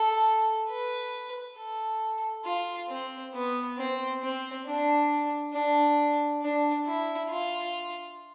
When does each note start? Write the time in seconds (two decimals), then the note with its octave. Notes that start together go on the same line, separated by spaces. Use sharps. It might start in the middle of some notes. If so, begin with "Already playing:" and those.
Already playing: A4
0.69 B4
1.58 A4
2.45 F4
2.88 C4
3.34 B3
3.77 C4
4.22 C4
4.66 D4
5.53 D4
6.42 D4
6.86 E4
7.29 F4